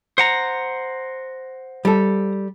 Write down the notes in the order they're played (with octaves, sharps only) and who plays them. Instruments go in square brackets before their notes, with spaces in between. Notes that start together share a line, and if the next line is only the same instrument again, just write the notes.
[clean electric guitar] C5 F#5 A#5
[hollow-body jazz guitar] G3 A4